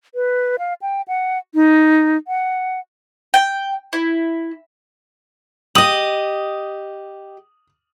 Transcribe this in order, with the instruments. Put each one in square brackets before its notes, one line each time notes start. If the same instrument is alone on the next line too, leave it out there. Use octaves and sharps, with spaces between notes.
[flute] B4
F5
G5
F#5
D#4
F#5
[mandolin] G5
E4
[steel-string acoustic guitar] G4 D#5 [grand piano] D#6 F#7